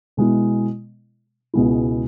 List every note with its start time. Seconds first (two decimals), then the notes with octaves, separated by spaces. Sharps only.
0.17 B2 G#3 E4
1.54 C#2 B2 G#3 E4